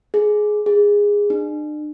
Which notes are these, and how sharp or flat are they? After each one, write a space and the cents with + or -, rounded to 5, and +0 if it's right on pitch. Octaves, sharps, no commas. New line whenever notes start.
G#4 +15
G#4 -15
D4 +45